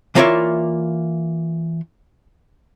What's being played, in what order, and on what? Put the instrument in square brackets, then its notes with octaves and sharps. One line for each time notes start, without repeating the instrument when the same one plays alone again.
[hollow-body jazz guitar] E3 A#3 F4 C#5 D5 E5